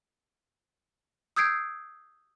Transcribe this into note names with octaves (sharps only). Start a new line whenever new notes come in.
D#6 E6 G6 G#6 C7 D7